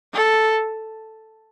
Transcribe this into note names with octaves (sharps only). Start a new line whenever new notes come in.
A4